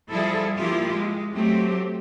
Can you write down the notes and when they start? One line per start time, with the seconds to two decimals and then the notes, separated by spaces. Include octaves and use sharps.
0.11 F3 G3 E4 G#4 A4
0.57 F3 A#3 E4 F4 G4
0.94 G#3
1.32 F#3 A3 C4 G4